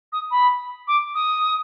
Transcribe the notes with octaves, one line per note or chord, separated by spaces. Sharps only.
D#6
B5
D6
D#6